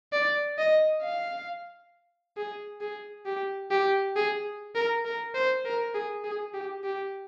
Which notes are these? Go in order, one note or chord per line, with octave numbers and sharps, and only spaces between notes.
D5
D#5
F5
G#4
G#4
G4
G4
G#4
A#4
A#4
C5
A#4
G#4
G#4
G4
G4